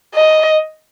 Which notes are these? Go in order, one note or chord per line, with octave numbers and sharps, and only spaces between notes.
D#5